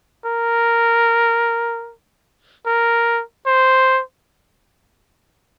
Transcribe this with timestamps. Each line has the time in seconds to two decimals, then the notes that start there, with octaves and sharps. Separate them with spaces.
0.25 A#4
2.66 A#4
3.46 C5